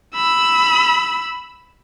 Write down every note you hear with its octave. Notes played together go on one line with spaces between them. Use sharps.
B5 E6